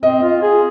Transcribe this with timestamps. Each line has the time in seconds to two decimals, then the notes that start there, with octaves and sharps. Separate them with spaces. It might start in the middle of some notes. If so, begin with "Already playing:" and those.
0.03 C4 D#5
0.23 F4
0.42 G#4